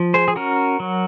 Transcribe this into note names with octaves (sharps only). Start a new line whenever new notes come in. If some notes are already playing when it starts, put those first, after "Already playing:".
Already playing: F3
G#4 C5
G#4
C#4 F#4 A#4
F#3